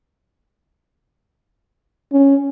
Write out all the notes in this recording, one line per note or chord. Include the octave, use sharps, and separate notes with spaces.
C#4